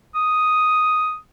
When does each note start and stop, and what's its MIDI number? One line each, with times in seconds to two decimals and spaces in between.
0.15 1.16 87